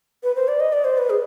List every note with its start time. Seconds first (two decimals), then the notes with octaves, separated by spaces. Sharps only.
0.23 B4
0.36 C5
0.48 D5
0.60 D#5
0.73 D5
0.85 C5
0.98 B4
1.10 G#4